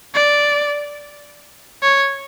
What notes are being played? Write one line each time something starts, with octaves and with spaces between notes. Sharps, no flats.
D5
C#5